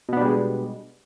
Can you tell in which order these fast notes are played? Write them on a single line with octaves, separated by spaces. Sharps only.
B2 B3 D4 G3 G#3